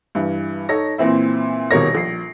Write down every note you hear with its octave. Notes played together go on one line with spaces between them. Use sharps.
G2 E3
D#4 A4 C#5 A#6
A#2 E3 C4 E4
D#1 G#1 B2 A#4 C#5 A#6
A#1 C7